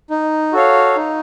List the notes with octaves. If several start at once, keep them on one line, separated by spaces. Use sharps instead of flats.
D#4
F#4 A4 C#5 F5
D#4